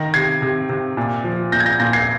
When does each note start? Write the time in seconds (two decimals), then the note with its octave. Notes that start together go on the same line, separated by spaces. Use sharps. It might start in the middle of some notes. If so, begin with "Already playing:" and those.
Already playing: D#3 A#6
0.14 C3 G#6 C7
0.42 C3
0.69 C3
0.97 A#2
1.24 F3
1.52 A#2 G6 A#6
1.60 G#6
1.66 G6 A#6
1.80 A#2 G6 A#6
1.93 G#6 C7